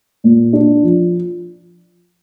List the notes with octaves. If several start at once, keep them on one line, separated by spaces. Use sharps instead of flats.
A#2
D4
F3